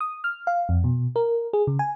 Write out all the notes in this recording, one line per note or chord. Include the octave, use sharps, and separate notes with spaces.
D#6
F6
F5
F2
B2
A#4
G#4
C#3
G#5